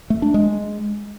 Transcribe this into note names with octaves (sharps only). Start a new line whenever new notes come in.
A3
D4
G#3